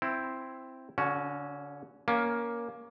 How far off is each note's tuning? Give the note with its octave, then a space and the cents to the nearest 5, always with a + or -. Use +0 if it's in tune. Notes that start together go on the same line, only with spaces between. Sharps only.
C4 +0 E4 +10
D3 -35 C#4 +0 F#4 +0
A#3 +10 C#4 +20